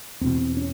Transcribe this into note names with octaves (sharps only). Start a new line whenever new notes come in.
E2 B2 C4
C#4